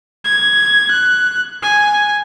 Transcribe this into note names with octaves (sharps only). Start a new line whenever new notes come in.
G#6
F#6
G#5